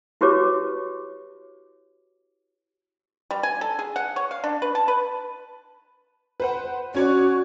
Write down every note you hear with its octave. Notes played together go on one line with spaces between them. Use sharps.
E4 F#4 G4 B4 C#5 D6
G3
G#5
A4
G#4
F#5
C#5
F5
D4
B4
A5
B4
B4 C5 F#5
C#4 F#4 C#5 D5